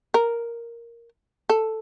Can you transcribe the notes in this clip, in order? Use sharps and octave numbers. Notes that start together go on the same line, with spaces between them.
A#4
A4